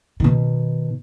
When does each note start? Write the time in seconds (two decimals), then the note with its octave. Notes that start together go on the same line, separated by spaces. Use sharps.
0.20 B2 D#3